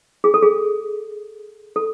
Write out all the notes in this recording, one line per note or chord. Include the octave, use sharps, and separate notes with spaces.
G#4
A4
G#4
A4